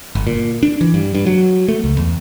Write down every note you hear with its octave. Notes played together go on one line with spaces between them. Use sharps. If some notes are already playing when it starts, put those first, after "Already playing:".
G1
A#2
D4
E3
G2
G2
F#3
A3
C#2
E2